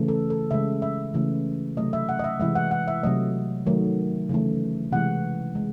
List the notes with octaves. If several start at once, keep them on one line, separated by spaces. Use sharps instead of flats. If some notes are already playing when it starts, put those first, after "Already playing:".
Already playing: C#3 E3 A3
A4
A4
C#3 G#3 E5
E5
C#3 E3 A3
C3 F#3 A3 D#5
E5
F#5
D#5
E5
C3 E3 G#3 E5
F#5
F#5
E5
C3 F#3 A3 D#5
D#3 F#3 A3
C#3 E3 A3
C3 E3 G#3 F#5
G#3